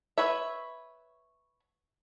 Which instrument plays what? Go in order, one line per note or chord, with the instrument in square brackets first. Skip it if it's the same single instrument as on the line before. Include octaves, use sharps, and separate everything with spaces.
[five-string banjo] B4 C#5 E5